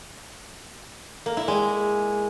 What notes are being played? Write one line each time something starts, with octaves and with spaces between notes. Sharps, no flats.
A#3
E4
G#3